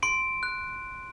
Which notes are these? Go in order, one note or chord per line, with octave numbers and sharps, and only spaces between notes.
C6 D7
F#6